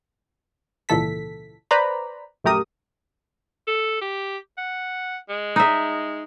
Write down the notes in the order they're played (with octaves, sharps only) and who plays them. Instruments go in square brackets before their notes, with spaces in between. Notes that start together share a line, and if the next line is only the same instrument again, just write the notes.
[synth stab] G#1 C#2 A#2 E3 A4 B6
B4 C5 D5 A#5 B5
A#1 F#2 A3 G4 A#4 D#6
[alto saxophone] A4
G4
F#5
G#3
[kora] D#4 E5